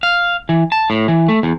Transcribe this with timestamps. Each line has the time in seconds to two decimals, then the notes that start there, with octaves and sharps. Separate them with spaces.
0.03 F5
0.49 E3
0.72 A5
0.90 A2
1.08 E3
1.28 A3
1.43 E2